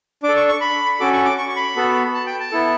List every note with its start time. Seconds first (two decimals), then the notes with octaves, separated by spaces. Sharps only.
0.23 D4 D6
0.28 A4
0.37 C#6
0.48 C#6
0.61 B5
1.00 C#4 F#4 A4 D6
1.13 C#6
1.25 D6
1.38 C#6
1.49 C#6
1.56 B5
1.76 B3 F#4 A4
2.14 A5
2.27 G5
2.40 A5
2.52 B3 E4 A4